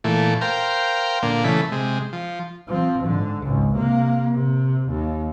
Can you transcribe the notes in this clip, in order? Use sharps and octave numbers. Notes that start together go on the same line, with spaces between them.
A#2 E3 A3
A#4 C5 F5 G5
A#2 D3 A#3
C#3 E3 A3 B5
C3 G#3
F3
F3 C4
G#2 D3
G#1 C#2
C3 A#3
C3
D#2